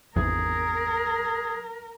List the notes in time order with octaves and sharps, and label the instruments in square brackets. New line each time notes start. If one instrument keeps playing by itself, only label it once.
[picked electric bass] G#1 E2 [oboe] G#4 [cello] A#4